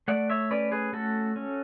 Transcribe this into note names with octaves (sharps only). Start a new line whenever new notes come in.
A3 D5 F#5
C#5 E5
C#4 B4 D5
G#4 B4
A3 F#4 A4
C#4